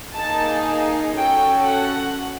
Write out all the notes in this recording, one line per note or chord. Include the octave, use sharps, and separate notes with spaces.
A#3 D#4 G#4 A5
C#4 F#4 A4 G5
F#5